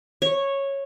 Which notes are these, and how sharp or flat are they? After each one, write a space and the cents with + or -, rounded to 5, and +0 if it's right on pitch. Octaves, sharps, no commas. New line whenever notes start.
C#5 -10